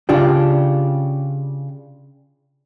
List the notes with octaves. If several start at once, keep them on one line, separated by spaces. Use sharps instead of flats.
C#3 D4 F4 G4